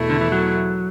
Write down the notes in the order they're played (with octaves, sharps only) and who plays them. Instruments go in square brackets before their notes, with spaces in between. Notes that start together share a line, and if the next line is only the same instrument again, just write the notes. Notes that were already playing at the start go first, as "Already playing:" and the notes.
Already playing: [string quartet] E2 B2 A3 E4
[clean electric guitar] D3
E3
F#3